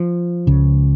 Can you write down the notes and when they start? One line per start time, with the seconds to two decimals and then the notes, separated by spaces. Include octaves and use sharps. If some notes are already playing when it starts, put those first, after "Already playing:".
Already playing: F3
0.47 C#2 C#3